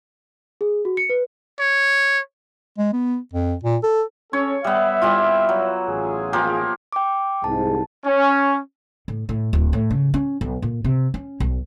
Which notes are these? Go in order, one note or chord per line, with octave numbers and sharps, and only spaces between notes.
G#4
F#4
C#7
B4
C#5
G#3
B3
F2
A#2
A4
C#4 A4 C#5
G3 B3 E5
G3 E4 F4
F#3
A1 F4 G#4
F3 A#3 G4
G5 D6
C2 G#2 A5
C#4
A2
A2
D1
A2
C#3
C#4
B1
A#2
C3
C#4
B1